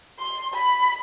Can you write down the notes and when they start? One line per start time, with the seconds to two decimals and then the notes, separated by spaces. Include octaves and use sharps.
0.19 C6
0.54 B5